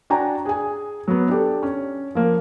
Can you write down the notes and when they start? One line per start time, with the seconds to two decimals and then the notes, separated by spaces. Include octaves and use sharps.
0.10 D4 F#4 G5 G#5 A#5
0.45 G#4 G#5
1.08 F#3 B3
1.29 D4 G4 A4
1.63 C#4
2.15 F3 A#3